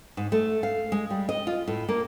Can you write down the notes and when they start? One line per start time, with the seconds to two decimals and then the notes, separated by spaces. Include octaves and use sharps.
0.17 G#2
0.32 A3
0.63 F5
0.92 G#3
1.10 G3
1.29 D#5
1.47 F4
1.68 A2
1.89 A#3